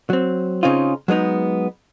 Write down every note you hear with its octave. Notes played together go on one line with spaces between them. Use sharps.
F#3 C4
C#3 C4 C#4 D#4 F4
F#3 G#3 B3 D#4